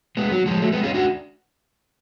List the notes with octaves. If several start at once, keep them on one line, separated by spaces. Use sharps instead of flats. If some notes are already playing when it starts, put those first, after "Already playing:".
G#3 B3
F#3
F3 G#3
F#3 A3
G#3 B3
C#4 F4
D4 F#4